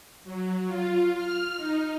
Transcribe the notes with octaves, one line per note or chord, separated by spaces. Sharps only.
F#3
F4
F6
D#4